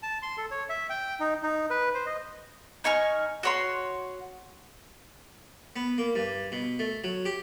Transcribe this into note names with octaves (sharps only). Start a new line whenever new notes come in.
A5
C6
A4
C#5
E5
G5
D#4
D#4
B4
C5
D#5
D#4 G#5 C#6 F6
F#4 C#5 C6
B3
A#3
G2
B2
A3
F#3
G4